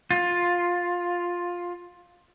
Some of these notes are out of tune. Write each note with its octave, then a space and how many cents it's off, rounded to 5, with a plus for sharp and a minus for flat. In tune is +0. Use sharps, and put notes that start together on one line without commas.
F4 +10